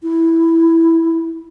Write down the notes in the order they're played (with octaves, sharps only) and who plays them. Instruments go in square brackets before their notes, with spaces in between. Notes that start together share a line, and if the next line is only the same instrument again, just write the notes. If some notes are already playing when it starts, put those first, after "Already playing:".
[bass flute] E4